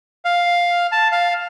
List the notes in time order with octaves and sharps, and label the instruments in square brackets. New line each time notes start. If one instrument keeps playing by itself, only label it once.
[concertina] F5
A5
F5